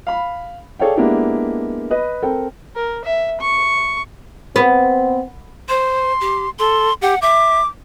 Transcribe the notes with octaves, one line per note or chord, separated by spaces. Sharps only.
F5 B5
G#4 A4 C#5 D5 F5 G5
G#3 A#3 B3 D4 E4 G4
B4 D#5
C4 A4 A#4 G5
A#4
E5
C#6
B3 C4
C5 C6
G4
A4 C6
G4 F#5
E5 D6